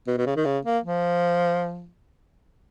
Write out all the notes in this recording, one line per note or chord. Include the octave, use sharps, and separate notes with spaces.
B2
B2
C#3
D#3
C#3
A#3
F3